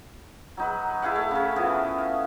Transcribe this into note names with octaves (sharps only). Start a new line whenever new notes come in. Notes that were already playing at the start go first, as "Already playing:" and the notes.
F#3 D#4 B4
E4 G#4 F5 F#5
A3
C#3 C#4
E3 F3 B3
F5